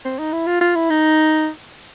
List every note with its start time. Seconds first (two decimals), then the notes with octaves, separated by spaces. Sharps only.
0.05 C4
0.19 D#4
0.32 E4
0.47 F4
0.61 F4
0.75 E4
0.90 D#4